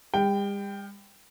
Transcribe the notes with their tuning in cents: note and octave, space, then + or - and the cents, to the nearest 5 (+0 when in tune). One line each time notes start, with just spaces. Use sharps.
G3 +45 G5 +0